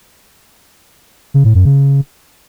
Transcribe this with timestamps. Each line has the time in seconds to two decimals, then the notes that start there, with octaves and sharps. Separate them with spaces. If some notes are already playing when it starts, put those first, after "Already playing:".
1.34 C#3
1.45 A2
1.55 F#2
1.65 C#3